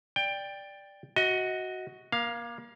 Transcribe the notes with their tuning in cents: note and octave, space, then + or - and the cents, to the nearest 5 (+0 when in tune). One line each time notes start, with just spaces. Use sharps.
D5 +0 G5 +15
F#4 +0 D#5 +30
A#3 +30 F5 +0